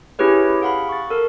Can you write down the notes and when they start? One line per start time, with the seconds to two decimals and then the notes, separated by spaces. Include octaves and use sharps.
0.19 C#4 E4 G4 G#4 B4 C#5
0.61 G#4 F5 F#5 B5
0.89 C#6 A6
1.10 A4 A#4